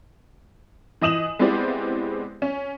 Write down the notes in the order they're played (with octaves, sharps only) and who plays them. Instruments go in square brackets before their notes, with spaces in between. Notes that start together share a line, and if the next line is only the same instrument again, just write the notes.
[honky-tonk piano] E3 D#5 D#6 E7 F#7
G#3 B3 C4 E4 G4 D5
C#4